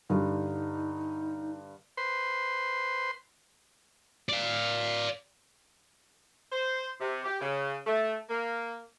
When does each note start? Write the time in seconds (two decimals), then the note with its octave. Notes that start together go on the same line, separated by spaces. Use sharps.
0.09 G2 D3 D#4
1.97 B4 C5 C6
4.29 D5 F5
6.52 C5
7.00 C3
7.25 G4
7.41 C#3
7.86 A3
8.30 A#3